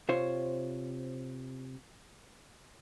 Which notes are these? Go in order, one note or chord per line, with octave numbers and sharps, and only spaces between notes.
C3 F4 C5 C#5